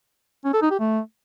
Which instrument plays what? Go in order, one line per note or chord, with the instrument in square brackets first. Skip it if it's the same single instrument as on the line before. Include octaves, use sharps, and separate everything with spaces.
[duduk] C#4
A4
D#4
G4
A3